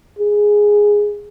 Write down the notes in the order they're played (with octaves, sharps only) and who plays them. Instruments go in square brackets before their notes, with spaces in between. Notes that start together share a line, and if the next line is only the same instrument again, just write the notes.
[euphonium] G#4